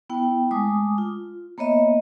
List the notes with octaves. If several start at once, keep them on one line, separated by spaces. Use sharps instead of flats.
B3 E4 G5
G#3 A3 G#5 D6 D#6
F4
A#3 B3 C#5 D#5 E5